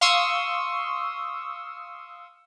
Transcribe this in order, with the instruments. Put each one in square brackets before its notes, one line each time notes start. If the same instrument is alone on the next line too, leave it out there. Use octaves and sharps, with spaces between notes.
[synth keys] F5 C6 C#6 D#6 E6